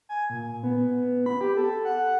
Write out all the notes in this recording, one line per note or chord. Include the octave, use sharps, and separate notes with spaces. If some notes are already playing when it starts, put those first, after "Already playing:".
G#5
A#2
B3
B5
G4
A4
F#5